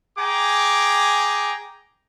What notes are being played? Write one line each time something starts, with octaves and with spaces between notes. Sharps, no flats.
G#4 G5 G#5 A#5 D6